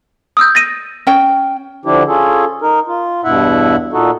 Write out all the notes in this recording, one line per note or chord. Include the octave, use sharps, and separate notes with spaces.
D#6 E6 G6
A6 A#6 D#7
C#4 G5
D3 F3 D4 E4 G4
C#4 F4 G#4 A4
D#4 A#4
F4
E2 G2 B2 E4 E5 F#5
A#2 D#4 F#4 A4